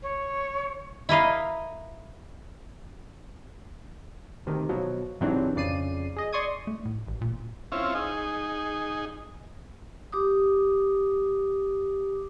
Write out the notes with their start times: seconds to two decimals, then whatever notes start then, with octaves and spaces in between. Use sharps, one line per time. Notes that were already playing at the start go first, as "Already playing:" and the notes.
0.03 C#5
1.09 E4 A#4 D#5 F5
4.46 D2 C3 D#3
4.69 B2 F3 F#3
5.21 G#2 C3 E3 F#3 C4 D4
5.55 F2 C#3 D5 C7 D#7
6.16 G#4 D#5
6.33 D5 C6 C#6 D#6 G#6
6.67 A3
6.85 A2
7.07 A1
7.21 A#2
7.72 C4 C#4 E4 F4
7.95 D#4 G#4
10.12 G4 D6 D#6